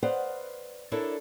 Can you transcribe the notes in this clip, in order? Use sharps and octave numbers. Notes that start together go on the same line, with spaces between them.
B4 C5 D5 D#5 F5 F#5
D4 E4 A4 A#4 C#5 D5